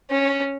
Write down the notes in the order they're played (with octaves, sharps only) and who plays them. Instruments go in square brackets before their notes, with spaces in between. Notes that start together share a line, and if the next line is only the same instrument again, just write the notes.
[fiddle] C#4